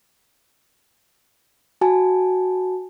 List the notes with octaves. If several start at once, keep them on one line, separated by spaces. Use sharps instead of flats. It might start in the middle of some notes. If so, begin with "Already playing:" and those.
F#4 G#5 A5